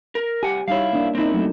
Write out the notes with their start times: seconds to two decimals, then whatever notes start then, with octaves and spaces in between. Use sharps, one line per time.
0.15 A#4
0.43 C2 G4 F#5 G#5
0.68 G3 D#4 E4 C#5 F5
0.93 A#3 D4
1.15 A#3 C4 C#4 D#4 E4
1.34 F#3 A3